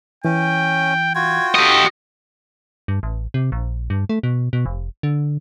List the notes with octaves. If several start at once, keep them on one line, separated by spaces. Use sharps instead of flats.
E3 C#4 G5
F4 F#4 G5 G#6
G4 A4 D#5
G2
A1
C3
A#1
G2
A3
B2
B2
F1
D3